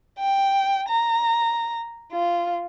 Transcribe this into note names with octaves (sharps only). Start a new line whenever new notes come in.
G5
A#5
F4